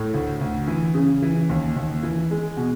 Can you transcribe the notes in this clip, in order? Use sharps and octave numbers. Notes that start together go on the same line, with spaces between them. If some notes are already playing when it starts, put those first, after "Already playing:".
Already playing: A2
D2
D2
E3
C#3
E3
D#2
D#2
E3
G#3
B2